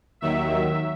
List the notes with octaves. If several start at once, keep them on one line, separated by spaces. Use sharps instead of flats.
D#2 D#3 F#3 E5
E5